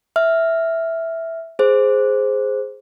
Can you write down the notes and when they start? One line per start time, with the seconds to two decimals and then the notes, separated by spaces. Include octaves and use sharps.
0.16 E5 F6
1.59 G#4 C5